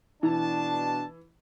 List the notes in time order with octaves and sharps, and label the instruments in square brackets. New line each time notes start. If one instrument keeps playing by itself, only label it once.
[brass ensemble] B2 D4 A5 [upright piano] E3